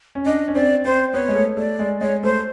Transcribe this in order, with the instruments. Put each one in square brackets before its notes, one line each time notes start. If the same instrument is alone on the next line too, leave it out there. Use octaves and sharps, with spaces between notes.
[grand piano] C#4
[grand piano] D4 [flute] D#5
[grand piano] C#4
[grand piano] C4 [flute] D5
[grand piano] C4 [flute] C5
[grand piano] B3 [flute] C#5
[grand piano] G#3
A3
[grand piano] A3 [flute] D5
[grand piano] G#3
[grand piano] G#3 [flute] C#5
[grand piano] A3 [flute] C5